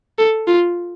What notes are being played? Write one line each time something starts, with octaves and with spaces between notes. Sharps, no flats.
A4
F4